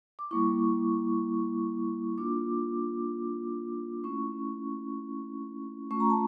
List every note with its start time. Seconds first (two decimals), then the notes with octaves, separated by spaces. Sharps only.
0.19 D6
0.31 G3 A#3 E4 C#6
2.18 A#3 D4 F4 D6
4.04 A3 C#4 E4 C#6
5.91 A3 C#4 F4 C#6
6.00 A#5
6.10 A5